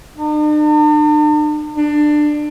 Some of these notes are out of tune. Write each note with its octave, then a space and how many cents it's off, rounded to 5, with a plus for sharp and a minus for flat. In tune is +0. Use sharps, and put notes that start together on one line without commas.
D4 +45
D4 +20